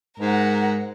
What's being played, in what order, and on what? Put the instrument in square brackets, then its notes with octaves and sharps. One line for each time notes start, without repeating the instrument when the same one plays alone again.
[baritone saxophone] G#2 [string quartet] A#4 F#5